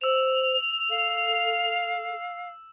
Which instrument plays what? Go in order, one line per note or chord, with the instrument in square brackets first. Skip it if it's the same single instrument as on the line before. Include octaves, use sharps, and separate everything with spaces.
[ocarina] C5 [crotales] E6 E7 [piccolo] F7
[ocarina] A4 [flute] F5